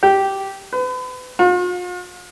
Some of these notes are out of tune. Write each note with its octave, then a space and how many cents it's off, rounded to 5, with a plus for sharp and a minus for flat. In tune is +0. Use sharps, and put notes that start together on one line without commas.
G4 -10
B4 +40
F4 +45